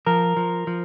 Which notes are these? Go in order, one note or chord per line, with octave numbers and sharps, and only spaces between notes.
F3 A#4
F3
F3